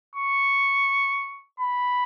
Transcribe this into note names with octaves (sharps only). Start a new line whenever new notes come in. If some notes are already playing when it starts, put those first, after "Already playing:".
C#6
B5